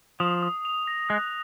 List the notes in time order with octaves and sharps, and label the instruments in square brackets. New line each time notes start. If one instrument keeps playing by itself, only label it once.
[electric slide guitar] F3 [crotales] D#6
[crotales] D#6
F7
A#6
[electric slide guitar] G#3 [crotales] F#6